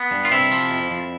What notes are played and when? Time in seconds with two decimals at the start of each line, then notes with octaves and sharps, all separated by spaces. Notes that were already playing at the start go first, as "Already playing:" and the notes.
Already playing: B3
0.11 G2
0.25 F4
0.31 C3 E4
0.52 F3
0.70 F2
0.91 F2